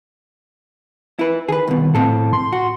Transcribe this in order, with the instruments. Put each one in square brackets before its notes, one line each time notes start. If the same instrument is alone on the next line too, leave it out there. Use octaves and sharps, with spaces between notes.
[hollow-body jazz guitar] E4 B4
[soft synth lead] D#3 [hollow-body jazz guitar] G#4 B4
[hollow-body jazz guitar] C2 B2
[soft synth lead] A2 [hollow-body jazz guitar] C4 A4
[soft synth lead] C6
[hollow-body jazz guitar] F#4